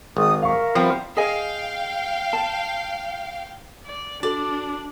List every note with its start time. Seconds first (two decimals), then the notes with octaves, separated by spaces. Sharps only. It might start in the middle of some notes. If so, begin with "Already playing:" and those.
0.17 G#1 D#4 G#4 D#6
0.42 A#4 E5 F5 C#6
0.75 F3 G3 B3 C4
1.17 G#4 D#5 F5 G5 G#5
2.33 A5
3.86 D5
4.23 D4 F#4 A4 D5